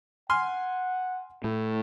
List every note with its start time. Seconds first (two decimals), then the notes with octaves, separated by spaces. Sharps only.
0.30 F#5 G#5 C6 F6
1.44 A2